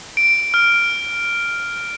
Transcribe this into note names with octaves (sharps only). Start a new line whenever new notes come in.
D7
F6